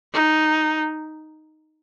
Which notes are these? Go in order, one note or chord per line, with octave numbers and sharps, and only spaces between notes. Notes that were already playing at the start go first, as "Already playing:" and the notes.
D#4